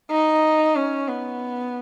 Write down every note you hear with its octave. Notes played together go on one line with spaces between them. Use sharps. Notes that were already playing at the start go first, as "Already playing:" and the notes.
D#4
C#4
B3